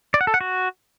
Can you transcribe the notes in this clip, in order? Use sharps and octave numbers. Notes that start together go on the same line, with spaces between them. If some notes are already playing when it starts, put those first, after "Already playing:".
D5
F#5
A4
F#5
F#4